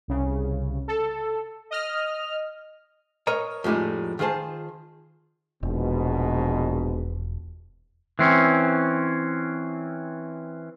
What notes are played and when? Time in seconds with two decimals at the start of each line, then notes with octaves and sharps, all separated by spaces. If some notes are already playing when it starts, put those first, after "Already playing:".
0.08 C2 C#3
0.88 A4
1.71 D#5 F6
3.27 A#4 C#5 D#5 A#5
3.64 F2 A2 G3 G#3 D#4
4.19 D#3 F4 G#4 C5 A5
5.63 E1 A#1 G#2 B2
8.19 E3 C4 C#4